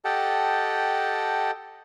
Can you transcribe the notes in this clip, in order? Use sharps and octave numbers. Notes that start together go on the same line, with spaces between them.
G4 A4 D#5 F#5 G5 A5